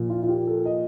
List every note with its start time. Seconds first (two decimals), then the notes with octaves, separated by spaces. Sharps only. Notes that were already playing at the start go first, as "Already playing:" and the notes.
Already playing: A#2 F3
0.10 F4
0.23 F4
0.29 G4
0.47 A4
0.65 D#5